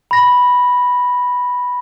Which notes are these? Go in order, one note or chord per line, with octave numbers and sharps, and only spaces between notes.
B5 A#6